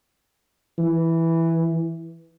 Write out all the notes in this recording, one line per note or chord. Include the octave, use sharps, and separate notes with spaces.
E3